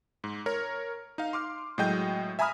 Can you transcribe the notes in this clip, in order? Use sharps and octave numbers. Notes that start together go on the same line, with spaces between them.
G#2
A#4 C#5
D#4 F5
C6 D6 F6
A2 F#3 G#3 D#5 G5 G6
E5 G#5 A#5 B5 D#6 F6